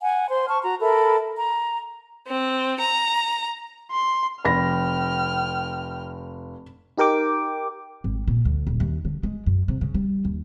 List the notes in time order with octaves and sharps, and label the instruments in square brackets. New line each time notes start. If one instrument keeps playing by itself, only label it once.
[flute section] F#5 G#5
C5 C6
A5 C#6 F6
F#4 A#5
A4 A#4 E5 B5
A#5
[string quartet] C4
A#5
[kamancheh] C6
[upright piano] F1 [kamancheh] G5 F6 [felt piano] B5 A#6
[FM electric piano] D#4 G4 A#4 G5 D6
[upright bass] G#1
A#2
D2
D#1
D#2
D3
G#3
F#2
C3
C#3
G3
D#2